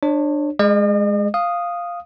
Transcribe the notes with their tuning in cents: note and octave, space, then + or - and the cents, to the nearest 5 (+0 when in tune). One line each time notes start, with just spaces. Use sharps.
D4 +20 C#5 -25
G#3 +0 D#5 -45
F5 +0 D#6 -5